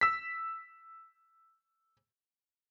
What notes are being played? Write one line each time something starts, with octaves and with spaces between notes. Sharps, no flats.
E6 B6